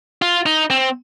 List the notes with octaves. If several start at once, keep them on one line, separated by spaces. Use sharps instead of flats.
F4
D#4
C4